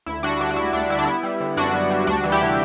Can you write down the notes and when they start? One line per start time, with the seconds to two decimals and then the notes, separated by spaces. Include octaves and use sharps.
0.06 D2 E4
0.23 G3 D4 F#4
0.40 D3 D4
0.51 F#4
0.56 D2 E4
0.73 D2 D4
0.90 G3 E4
0.99 D4
1.05 B3 E4
1.23 G3
1.40 D3
1.57 F#2 D4 F#4
1.73 B3
1.90 G3
2.07 D2 D4 F#4
2.24 E3
2.32 E4 G4
2.41 C3